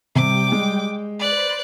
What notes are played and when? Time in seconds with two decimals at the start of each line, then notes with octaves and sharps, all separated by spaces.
0.16 C3 G3 G5 D6
0.52 G#3
1.19 B4 C5 D5 F#6